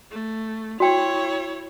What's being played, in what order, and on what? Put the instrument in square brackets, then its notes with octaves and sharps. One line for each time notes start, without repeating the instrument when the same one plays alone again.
[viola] A3
[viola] E4 C#5 [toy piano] F#4 G5